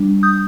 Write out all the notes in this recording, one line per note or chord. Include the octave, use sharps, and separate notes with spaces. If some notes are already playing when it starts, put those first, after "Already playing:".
Already playing: G3 D4
D#6 G6